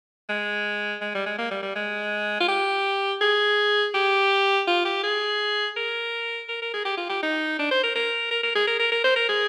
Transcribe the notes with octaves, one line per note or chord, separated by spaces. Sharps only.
G#3
G#3
G3
G#3
A#3
G3
G3
G#3
F4
G4
G#4
G4
F4
G4
G#4
A#4
A#4
A#4
G#4
G4
F4
G4
D#4
D4
C5
A#4
A#4
A#4
A#4
G#4
A#4
A#4
A#4
C5
A#4
G#4